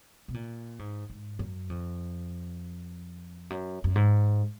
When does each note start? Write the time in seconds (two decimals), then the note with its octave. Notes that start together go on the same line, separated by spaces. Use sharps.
0.28 B2
0.34 A#2
0.79 G#2
1.10 G#2
1.39 F#2
1.70 F2
3.50 F#2
3.84 F#2
3.96 G#2